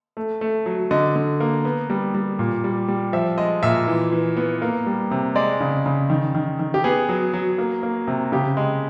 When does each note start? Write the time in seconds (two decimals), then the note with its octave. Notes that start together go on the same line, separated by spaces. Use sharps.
0.17 A3
0.41 A3
0.66 F#3
0.91 D3 D#5
1.16 D3
1.40 A#3
1.65 B3
1.90 G3
2.15 G3
2.39 A#2
2.64 G3
2.88 G3
3.13 F3 E5
3.38 G#3 D#5
3.63 A#2 E5
3.88 E3
4.12 E3
4.37 B3
4.62 A#3
4.86 G3
5.11 C3
5.35 G#3 D5
5.60 C#3
5.86 C#3
6.10 D#3
6.35 D#3
6.59 D#3
6.74 G4
6.84 B3 G#4
7.09 F#3
7.33 F#3
7.58 A#3
7.83 A#3
8.07 C3
8.32 C#3 G4
8.57 G#3